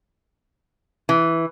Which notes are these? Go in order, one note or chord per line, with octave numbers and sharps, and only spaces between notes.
E3